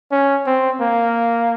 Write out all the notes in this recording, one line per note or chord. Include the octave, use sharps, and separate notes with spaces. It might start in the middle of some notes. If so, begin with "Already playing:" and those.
C#4
C4
A#3